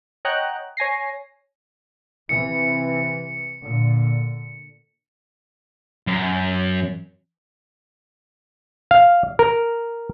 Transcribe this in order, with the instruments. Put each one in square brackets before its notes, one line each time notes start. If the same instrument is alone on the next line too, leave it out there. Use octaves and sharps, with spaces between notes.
[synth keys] C#5 D#5 F#5 G5 A#5 F#6
C#5 G#5 A#6 C7
[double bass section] C3 E3 [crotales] C#7
[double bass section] A#2 D3
[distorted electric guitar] F#2
[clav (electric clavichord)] F5
A#4